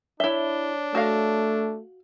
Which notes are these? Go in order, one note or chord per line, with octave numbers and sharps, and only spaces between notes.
D4 E4 C#5 E5 G7
A3 F#4 F5